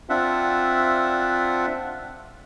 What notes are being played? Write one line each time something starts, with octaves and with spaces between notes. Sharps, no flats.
C4 D4 F4 E5 F#5